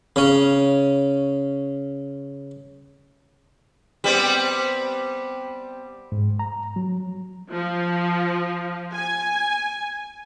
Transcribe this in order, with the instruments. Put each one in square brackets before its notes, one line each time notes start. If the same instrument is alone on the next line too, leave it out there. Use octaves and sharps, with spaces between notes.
[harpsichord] C#3 C#4
[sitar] G3 B3 C4
[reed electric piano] G#2
A#5
F#3
[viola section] F3
G#5